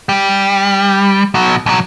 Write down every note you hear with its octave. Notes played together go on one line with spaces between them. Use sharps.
G3
B2 F#3
B1 F#3